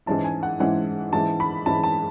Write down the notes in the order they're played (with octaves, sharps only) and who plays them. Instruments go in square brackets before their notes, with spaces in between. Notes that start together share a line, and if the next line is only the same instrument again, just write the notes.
[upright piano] G#2 E3 G#3 C#4 E4 [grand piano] A5
[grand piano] G#5
F#5
[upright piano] G#2 E3 G#3 C#4 E4 [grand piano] F#5
[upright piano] G#2 E3 G#3 C#4 E4 [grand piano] A5
[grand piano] B5
[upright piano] G#2 E3 G#3 C#4 E4 [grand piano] A5
[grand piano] A5